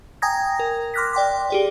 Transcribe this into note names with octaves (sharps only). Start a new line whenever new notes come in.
G5 G#5 A#5 D#6 G#6 A#6
A#4
C6 D6 F6 F#6 A#6 B6
D5 G5 C6 D6
G4 G#4 D5